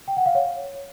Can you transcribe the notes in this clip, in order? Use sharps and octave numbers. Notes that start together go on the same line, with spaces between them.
G5
F#5
F5
C#5